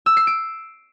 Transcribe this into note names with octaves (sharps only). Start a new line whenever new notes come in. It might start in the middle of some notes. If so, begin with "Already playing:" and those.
E6
C7
D7